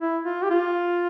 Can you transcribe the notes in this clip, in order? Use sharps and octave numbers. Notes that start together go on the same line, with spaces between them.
E4
F4
G4
F4